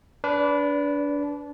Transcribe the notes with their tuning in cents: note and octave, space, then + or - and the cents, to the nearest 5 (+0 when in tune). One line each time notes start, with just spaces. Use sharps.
D4 -25 B4 +0 D5 +0